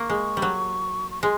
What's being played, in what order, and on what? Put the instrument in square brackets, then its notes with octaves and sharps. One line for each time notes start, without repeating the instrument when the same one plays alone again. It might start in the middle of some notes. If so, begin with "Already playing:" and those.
Already playing: [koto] A#3 [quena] C#6
[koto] G#3
G3
F#3
[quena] C#6
[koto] G#3 [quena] C6